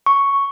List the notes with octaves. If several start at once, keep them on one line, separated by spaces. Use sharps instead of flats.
C#6